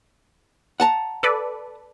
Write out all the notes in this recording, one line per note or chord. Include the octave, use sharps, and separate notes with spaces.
F#5 A5 A#5
A4 B4 D5